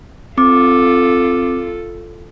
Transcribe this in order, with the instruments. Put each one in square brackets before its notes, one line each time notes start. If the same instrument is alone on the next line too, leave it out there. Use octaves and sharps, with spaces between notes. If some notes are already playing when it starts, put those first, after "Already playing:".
[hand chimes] C4 D6 [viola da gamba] F4 A4